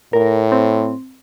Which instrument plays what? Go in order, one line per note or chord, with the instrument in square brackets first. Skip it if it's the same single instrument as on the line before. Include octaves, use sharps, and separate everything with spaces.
[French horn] A2 [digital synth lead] A#4
[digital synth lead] C4